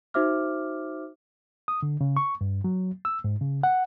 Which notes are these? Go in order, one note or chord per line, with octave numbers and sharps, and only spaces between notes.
D#4 F#4 C5 E5 D6 F6
D#6
D3
C#3
C#6
G2
F#3
E6
G#2
C#3
F#5